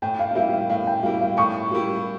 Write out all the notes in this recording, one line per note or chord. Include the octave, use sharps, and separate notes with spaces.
A2 G5
F5
F5
G3 A#3 E4 G4 E5
F5
A2 F5
G5
G3 A#3 E4 G4 F5
F5
A2 C#6
G3 A#3 E4 G4